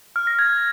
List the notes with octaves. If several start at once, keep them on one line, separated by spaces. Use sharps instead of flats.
F6
A#6
G#6